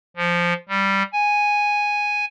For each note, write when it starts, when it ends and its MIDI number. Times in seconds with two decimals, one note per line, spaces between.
0.17 0.53 53
0.69 1.03 55
1.13 2.25 80